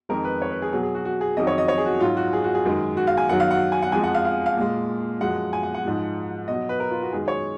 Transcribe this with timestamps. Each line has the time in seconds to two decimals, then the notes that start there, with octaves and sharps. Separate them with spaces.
0.09 F2 D#3 G#3 A#4
0.25 B4
0.42 C#5
0.51 B4
0.62 G#4
0.73 B2 F#3 G#4
0.83 G#4
0.95 F#4
1.05 F#4
1.21 G#4
1.37 F2 D#3 F#3 D#5
1.47 C#5
1.58 D#5
1.68 C#5
1.78 G#4
1.86 F#4
2.00 G#2 F#3 F4
2.17 F#4
2.33 G#4
2.44 F#4
2.55 G#4
2.65 F#2 D#3 G#3
2.97 F#4
3.07 F5
3.17 G#5
3.29 F#2 D#3 F#3 F#5
3.40 F5
3.51 F#5
3.72 G#5
3.82 F#5
3.92 F2 F3 G#3 G#5
4.03 F#5
4.14 F5
4.25 F5
4.46 F5
4.57 A#2 G#3
5.21 F#2 F3 G#3 F#5
5.53 G#5
5.63 F#5
5.74 F#5
5.85 G#2 F3 G#3
6.48 B2 F#3 D#5
6.69 B4
6.80 A#4
6.91 F4
7.02 F#4
7.13 F#2 D#3 G#3 G#4
7.28 C#5